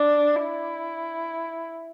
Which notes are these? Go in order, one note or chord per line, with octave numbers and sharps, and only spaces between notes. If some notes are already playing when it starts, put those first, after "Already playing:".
Already playing: D4
E4